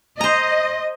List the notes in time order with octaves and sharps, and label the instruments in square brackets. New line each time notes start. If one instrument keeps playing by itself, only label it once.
[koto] C5 A#5 [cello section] D#5